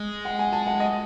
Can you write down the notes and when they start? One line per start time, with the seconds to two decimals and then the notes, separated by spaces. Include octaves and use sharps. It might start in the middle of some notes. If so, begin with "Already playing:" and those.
Already playing: G#3
0.25 F#5
0.39 G#5
0.53 A5
0.67 F#5
0.80 D#5